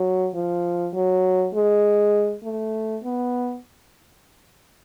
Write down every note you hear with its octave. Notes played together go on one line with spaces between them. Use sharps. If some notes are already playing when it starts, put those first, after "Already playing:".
Already playing: F#3
F3
F#3
G#3
A3
B3